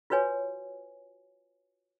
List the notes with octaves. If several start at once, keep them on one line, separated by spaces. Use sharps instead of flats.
F4 F#4 B4 C#5 G#5